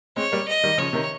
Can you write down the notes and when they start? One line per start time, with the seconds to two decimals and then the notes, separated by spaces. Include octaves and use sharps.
0.16 G#3 C4 C#5
0.32 G3 A#3
0.48 D#5
0.64 D#3 G3
0.78 C#3 F3 C#5
0.93 C3 D#3